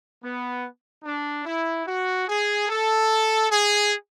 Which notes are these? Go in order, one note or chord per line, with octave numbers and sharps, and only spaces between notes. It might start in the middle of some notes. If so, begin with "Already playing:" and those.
B3
D4
E4
F#4
G#4
A4
G#4